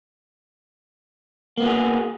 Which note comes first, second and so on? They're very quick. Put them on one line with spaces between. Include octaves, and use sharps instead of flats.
A#3 B3 F#4 G#4